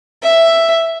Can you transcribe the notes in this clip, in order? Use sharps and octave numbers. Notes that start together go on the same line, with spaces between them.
E5